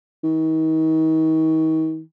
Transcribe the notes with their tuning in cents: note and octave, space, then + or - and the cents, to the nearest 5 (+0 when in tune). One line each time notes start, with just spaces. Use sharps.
D#3 +40